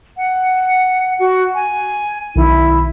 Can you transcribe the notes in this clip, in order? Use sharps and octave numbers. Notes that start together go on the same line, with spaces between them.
F#5
F#4
G#5
B1 D#3 E4